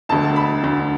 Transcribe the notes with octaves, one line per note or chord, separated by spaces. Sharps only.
E1 D2 D3 A5
B5
E1 D2 D3